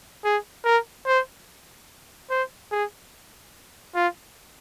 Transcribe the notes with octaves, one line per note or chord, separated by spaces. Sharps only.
G#4
A#4
C5
C5
G#4
F4